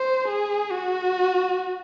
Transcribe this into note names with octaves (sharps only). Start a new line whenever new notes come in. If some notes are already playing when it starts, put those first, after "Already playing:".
Already playing: C5
G#4
F#4